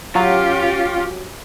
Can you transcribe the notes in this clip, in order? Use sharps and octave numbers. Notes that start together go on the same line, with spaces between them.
F#3 C#4 F4 G4